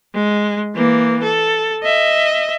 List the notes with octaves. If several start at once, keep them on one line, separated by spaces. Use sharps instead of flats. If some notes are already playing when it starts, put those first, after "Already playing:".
G#3
E3 A#3
A4
D#5 E5